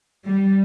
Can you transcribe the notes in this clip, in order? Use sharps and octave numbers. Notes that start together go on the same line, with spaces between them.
G3